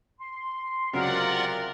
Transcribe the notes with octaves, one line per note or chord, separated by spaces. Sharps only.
C6
C#2 C3 F#3 F4 A#4 D5 F#5